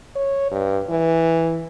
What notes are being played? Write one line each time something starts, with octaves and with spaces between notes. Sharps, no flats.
C#5
G2
E3